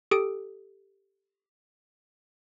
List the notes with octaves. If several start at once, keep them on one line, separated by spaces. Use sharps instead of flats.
G4 A4 D#6 D7